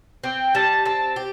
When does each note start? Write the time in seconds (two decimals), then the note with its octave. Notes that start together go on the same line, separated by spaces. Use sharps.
0.24 C4 G5
0.55 G3 A5
0.85 C4 A5
1.16 G4